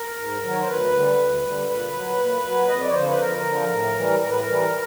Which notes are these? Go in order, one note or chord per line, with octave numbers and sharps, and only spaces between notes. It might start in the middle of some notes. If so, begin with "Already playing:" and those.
Already playing: A#4
G#2
D#3 F#3
C#5
C5
D2 B4
D3 G3
D2
D3 G3
A#2 B4
F#3
A#2
F#3
F2 D#5
D5
C#5
D3 F3 C5
B4
F2 A#4
D3 F3
A2
E3 G3
A2 A#4
B4
A#4
E3 G3